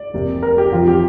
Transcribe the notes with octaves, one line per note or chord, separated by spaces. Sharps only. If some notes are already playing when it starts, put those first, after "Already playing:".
Already playing: D5
F1 F2 C3 A#3
A#4
G4
F2 F3 C4 F4
G4